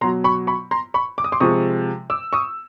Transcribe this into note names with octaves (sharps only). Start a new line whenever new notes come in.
B2 F#3 A#5 C6
B5 C#6
B5 C#6
A#5 C6
B5 C#6
D6
D#6
C6 D6
C3 F3 G#3 C#6 D#6
D6 E6
C#6 D#6